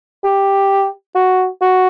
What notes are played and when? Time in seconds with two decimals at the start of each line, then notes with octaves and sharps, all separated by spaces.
0.24 G4
1.15 F#4
1.61 F#4